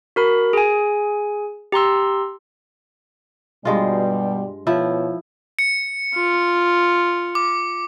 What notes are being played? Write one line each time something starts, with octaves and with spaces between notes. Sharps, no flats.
F#4 A#4 B5
G#4 G#5
G4 A#5 C6 E6
G2 B2 G3 G#3 F4
B2 F3 E4 C#5
C#7
F4
D6